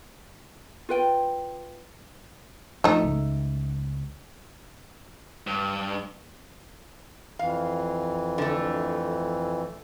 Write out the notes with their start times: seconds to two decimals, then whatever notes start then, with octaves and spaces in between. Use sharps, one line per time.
0.89 F4 B4 G5
2.84 A2 F3 A3 D#4
3.04 C#2
5.47 G2
7.39 F2 E3 F5
8.38 D3 A3